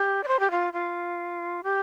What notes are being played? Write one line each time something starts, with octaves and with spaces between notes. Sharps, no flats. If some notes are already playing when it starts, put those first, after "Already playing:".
Already playing: G4
D5
C5
G4
F4
F4
G4